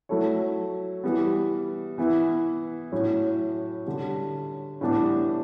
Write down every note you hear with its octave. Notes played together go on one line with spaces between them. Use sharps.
F#3 A3 E4 A4 C#5
E3 G3 B3
E3 B3 E4
A2 F#3 C#4
D3 G3 C#4
A2 E3 G3 B3 D4